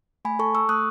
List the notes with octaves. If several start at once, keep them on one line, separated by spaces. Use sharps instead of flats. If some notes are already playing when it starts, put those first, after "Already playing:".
A3 G#5 B5
A4 A5 C#6
A4 C#6 E6
A3 D#6 F#6